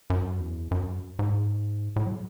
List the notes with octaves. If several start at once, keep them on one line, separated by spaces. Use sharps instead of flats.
F#2
E2
F#2
G#2
A2
F#3